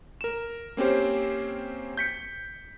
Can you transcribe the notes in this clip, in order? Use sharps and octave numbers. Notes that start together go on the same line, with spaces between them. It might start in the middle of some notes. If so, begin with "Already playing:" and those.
A#4 E7
A#3 C4 C#4 G4 C5
G6 B6 C#7